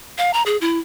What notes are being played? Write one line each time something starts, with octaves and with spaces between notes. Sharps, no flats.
F5
A#5
G#4
E4